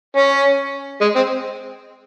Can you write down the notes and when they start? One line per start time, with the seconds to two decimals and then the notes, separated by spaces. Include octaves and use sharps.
0.17 C#4
1.01 G#3
1.16 C4